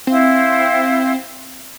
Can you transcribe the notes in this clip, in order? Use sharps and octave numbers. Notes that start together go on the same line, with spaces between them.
C4 E4 C5 F5